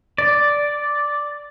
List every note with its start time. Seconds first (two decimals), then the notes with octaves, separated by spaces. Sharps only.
0.18 D5